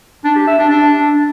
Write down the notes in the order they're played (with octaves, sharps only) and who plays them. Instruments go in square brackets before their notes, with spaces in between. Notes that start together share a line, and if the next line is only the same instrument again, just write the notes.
[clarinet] D4
G4
E5
D4
D4